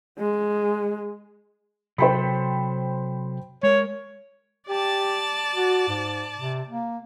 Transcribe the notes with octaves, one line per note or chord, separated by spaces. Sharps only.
G#3
C3 F#3 A4 C5 G5 B5
G#3 A#4 C#5
G4 D5 A5
F#4
G#2
C3
A#3